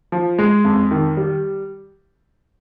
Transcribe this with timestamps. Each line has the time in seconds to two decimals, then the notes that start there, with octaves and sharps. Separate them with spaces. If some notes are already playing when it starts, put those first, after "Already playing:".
0.12 F3
0.39 G#3
0.64 F2
0.91 D#3
1.17 G3